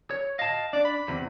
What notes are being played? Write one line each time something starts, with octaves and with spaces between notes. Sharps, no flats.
C#5
D#5 F5 A5
D4 D5
B5
E2 C3